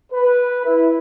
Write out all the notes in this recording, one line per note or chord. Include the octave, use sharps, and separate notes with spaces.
B4
E4